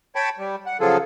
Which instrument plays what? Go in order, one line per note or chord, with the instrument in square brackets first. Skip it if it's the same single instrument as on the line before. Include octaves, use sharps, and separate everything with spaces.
[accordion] C#5 G5 A5 B5
G3
F#5
C#3 F3 F#3 F4 G#4 A4